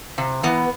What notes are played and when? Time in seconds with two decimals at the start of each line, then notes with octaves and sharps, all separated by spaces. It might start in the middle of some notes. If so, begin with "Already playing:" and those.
0.18 C3
0.43 E3 B3